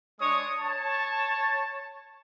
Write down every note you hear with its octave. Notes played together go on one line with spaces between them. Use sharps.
G#3 D4 C#5 C#6 D#6
C#5 A5